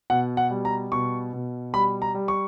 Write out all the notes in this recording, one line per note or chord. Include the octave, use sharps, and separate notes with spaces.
B2 F#5
F#5
G3
A#5
B2 C#6
B2
G3 B5
A#5
G3
C#6